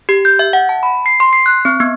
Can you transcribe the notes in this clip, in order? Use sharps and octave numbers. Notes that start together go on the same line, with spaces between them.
G4
G6
E5
F#5
A5
B5
C7
C6
C7
F#6
C4
B3